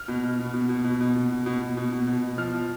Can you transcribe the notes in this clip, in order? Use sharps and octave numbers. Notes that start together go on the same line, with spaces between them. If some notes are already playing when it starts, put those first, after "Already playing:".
Already playing: F6
B2
B2
B2
B2
B2
B2
B2
B2
B2
B2
B2
B2
B2
B2
B2
F3 F6
F3